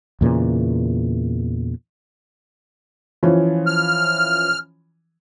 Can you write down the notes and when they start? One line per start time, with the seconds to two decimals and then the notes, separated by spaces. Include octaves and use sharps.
0.21 E2 A#2 C#3 E3
3.23 E3 F3 C#4
3.67 F6